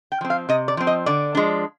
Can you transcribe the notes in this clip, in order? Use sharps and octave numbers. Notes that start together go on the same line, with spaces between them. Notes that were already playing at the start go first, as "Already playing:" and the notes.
G5
F3 C4
F5
C3 D#5
D5
F3 C4
D#5
D3 D5
F3 G#3 D4